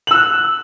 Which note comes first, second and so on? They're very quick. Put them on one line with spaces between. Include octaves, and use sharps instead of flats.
F#7 E6 F#6